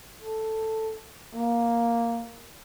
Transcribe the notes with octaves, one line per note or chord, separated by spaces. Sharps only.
A4
A#3